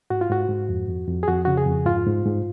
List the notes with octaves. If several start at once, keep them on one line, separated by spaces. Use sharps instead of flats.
G#2 F#4
F4
G#2 F#4
G#2
F2
F2
F2
G#4
F2 F#4
C#3 F#4
G#4
F2
G#2 F4
G#2
G#2